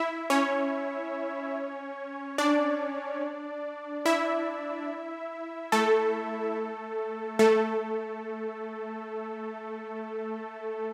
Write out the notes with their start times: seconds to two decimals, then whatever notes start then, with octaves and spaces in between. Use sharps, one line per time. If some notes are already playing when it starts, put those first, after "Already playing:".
Already playing: E4 E5
0.30 C#4 C#5
2.38 D4 D5
4.06 E4 E5
5.72 A3 A4
7.39 A3 A4